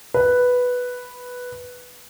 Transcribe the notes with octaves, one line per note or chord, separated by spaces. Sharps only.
B4